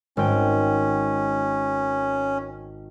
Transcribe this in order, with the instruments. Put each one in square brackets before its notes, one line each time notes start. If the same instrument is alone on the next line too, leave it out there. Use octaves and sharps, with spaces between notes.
[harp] G#1 G5 [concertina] C#4